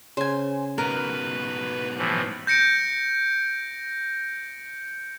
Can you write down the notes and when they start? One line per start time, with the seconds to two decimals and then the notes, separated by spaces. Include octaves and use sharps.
0.17 C#3 C5 G#5
0.78 G#2 B2 A#4 B4
1.98 A2 E3 F3
2.47 G6 A#6 C#7 D7